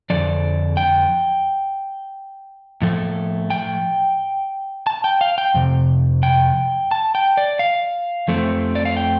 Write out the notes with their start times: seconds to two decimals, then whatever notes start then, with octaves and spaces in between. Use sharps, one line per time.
0.10 F2 D3 F3 D5
0.77 G5
2.82 A2 F3 A3
3.50 G5
4.87 A5
5.04 G5
5.21 F5
5.38 G5
5.54 F2 C3
6.23 G5
6.91 A5
7.15 G5
7.37 D5
7.59 F5
8.28 F2 F3 A3 C4
8.75 D5
8.85 F5
8.97 G5